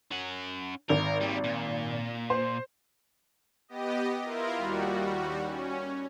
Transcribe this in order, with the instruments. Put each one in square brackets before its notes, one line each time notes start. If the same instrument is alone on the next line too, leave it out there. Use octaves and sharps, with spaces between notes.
[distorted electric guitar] C#4 F#5
[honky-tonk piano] G#1 [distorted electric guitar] A#4
[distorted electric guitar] D#2 G3
A#2
[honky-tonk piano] C5
[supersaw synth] B3 G4 D#5
E4 F4 A#4
D#2 G3 F#4
C#4